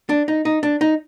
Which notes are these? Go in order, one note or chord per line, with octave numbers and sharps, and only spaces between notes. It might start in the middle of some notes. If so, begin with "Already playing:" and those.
D4
D#4
D#4
D4
D#4